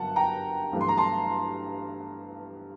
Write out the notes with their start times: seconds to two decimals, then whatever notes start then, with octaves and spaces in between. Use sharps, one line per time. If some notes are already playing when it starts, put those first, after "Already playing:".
Already playing: G1 G2 F#3 A#3 F#5 A5
0.16 G5 A#5
0.72 A1 G2 F#3 A3
0.81 C6
0.88 A#5
0.98 A5 C6